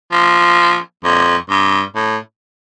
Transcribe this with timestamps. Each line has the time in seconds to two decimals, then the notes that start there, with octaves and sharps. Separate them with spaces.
0.12 F3
1.04 F2
1.50 G2
1.96 A2